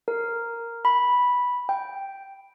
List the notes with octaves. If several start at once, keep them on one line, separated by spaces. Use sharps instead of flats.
A#4
B5
G5